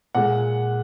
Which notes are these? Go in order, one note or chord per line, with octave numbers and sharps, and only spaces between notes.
A#2 G#3 F#5